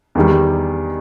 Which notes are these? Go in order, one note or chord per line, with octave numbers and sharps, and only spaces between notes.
E2 D#3 G3